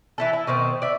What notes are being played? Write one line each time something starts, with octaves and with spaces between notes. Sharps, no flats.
E3 E4 A4
E4
B2 D#3 C4
D5 E5